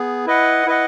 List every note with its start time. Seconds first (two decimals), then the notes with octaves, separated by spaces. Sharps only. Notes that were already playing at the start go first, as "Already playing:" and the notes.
Already playing: B3 G#4
0.26 E4 B4 D#5 F#5
0.67 E4 B4 D#5 F#5